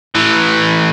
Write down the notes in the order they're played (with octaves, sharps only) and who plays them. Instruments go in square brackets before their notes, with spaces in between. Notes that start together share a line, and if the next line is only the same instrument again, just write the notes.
[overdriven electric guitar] A2 E3